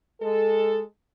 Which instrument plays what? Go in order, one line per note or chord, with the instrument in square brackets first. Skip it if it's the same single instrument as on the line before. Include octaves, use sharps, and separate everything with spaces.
[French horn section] G#3 A4